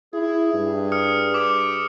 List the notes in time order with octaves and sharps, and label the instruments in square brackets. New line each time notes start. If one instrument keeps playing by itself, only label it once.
[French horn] E4 [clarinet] G#4
[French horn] G2
[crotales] D#6 F6 C#7
[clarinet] G4 [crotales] D6